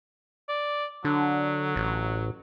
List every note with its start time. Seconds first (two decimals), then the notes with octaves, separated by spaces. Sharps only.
0.49 D5
1.05 D3 F#3
1.76 A1